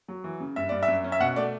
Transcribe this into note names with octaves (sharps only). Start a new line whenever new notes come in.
F#3
E3
C#3
G2 E5
G2 D5
E5
F#2
C#4
E5
B2 F#5
A3 D5